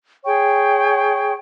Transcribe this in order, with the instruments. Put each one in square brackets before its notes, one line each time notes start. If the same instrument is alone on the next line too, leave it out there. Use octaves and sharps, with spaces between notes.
[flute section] G#4 C#5 G5 C#6